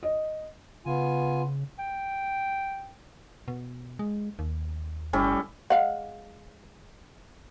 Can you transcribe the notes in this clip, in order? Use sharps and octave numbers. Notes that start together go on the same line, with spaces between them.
D#5
C#3 B3 F4 G#5
G5
B2
G#3
D#2
G1 A2 G3 C#4
G#3 F5 F#5